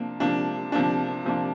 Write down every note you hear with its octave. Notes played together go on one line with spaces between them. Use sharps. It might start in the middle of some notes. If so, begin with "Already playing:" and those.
Already playing: C3 F3 A#3 D4
C3 F3 A#3 D4
C3 F3 A#3 D4
C3 F3 A#3 D4